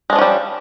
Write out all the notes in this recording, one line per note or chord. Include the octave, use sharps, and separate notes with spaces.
F3 G3 G#3 C#4 D4